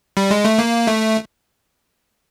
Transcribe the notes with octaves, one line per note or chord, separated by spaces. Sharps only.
G3
G#3
A3
A#3
A3